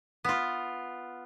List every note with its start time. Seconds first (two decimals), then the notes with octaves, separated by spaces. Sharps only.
0.24 B3 F4